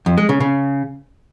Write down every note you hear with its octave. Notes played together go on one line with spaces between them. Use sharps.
F2
G#3
C#3
C#3